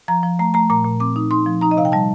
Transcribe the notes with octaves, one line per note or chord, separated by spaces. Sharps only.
F3 A#5
F3
A3 A#5
A3 A#5
A#2 A#5
A#2
C4 D6
D#4
D#4 C6
F3
D#4 A#5
D#5
C3 F5
G5
G3 A5